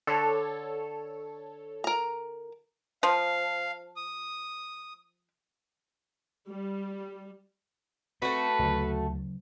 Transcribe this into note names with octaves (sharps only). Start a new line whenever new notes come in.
D3 A4 C#5
A#4 A#5
F3 F5
D#6
G3
A3 C4 F#4 B4
D2 C#3 F#3